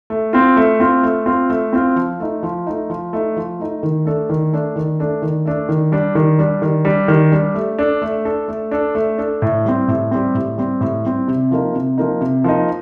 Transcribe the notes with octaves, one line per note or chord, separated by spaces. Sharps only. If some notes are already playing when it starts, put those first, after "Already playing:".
A3
C4 F4
A3
C4 F4
A3
C4 F4
A3
C4 F4
F3
A3 D#4
F3
A3 D#4
F3
A3 D#4
F3
A3 D#4
D#3
A3 D4 A4
D#3
A3 D4 A4
D#3
A3 D4 A4
D#3
A3 D4 A4
D#3
G3 D4
D#3
G3 D4
D#3
G3 D4
D#3
G3 D4
A3
D4 A4
A3
D4 A4
A3
D4 A4
A3
D4 A4
A2
G3 C4
A2
G3 C4
A2
G3 C4
A2
G3 C4
C3
F3 A#3 D#4
C3
F3 A#3 D#4
C3
F3 A#3 D#4